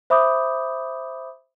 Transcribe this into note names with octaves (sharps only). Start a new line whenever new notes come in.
C5 E5 B5 D6 D#6 G6